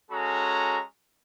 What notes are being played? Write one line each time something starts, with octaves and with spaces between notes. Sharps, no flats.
G#3 C#4 F#4 A4 A#5